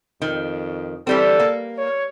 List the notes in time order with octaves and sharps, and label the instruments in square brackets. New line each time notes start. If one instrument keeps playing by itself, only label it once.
[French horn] F2 [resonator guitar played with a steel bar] D#3
[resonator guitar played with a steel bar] E3 G3 C4 [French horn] A4
[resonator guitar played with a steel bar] A#3
[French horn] C#5